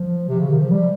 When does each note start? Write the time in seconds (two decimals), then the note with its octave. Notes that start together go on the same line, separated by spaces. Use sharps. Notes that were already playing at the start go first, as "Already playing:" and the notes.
Already playing: F3
0.29 C3
0.40 C#3
0.50 D#3
0.61 F3
0.71 G3